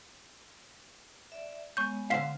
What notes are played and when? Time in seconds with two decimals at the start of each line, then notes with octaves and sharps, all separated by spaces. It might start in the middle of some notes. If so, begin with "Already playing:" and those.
1.32 D5 E5
1.77 G#3 B3 C#5 C#6 G6
2.10 D3 C5 F5 F#5 B6 C7